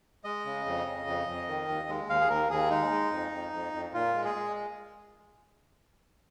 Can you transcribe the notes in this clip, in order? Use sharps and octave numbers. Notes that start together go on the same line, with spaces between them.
G#3 D#5
C#3
F2
C#3
F2
F2
D#3
D#2
G#3
D#2 F5
G#4
D#2 A#4
D#2 G#4
G#3 D#4
G#3
F2
F2
F2
F2
A#2 F4
G#3
G#4
G#3